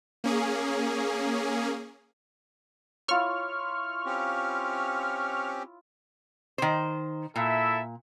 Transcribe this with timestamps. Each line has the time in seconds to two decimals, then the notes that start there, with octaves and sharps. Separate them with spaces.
0.24 A#3 C#4 G#4
3.08 E4 F4 C#5 C#6 F6
4.06 C4 C#4 G4
6.58 D#3 C5
7.36 A#2 E4 A4 E5